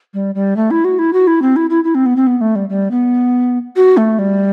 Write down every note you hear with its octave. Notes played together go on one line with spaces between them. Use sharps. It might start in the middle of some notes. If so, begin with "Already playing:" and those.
G3
G3
A3
E4
F#4
E4
F#4
E4
C4
E4
E4
E4
C4
B3
C4
B3
A3
G3
G3
B3
F#4
A3
G3